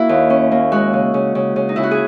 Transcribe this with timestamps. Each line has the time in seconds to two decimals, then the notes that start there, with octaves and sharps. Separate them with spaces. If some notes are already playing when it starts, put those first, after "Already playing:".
Already playing: A#3 E4 F#4
0.09 D#2
0.30 C#4
0.52 A#3
0.72 G#3 F#4
0.93 C#3
1.14 C#3
1.35 C#3
1.56 C#3
1.69 D#4
1.76 C#3 E4
1.83 F#4
1.91 G#4